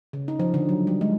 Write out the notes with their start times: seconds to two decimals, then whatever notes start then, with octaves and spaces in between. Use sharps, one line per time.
0.13 C#3
0.28 D#4
0.40 F3
0.54 D3
0.69 F#3
0.87 G3
1.01 G#3